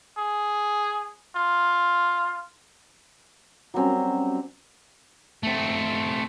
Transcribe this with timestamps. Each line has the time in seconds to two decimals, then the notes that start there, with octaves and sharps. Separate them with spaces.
0.17 G#4
1.35 F4
3.74 F#3 G3 C4 C#4
5.43 A3 C4